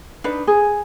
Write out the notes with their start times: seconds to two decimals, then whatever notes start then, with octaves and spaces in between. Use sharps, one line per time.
0.24 D4 D#4 B4
0.47 G#4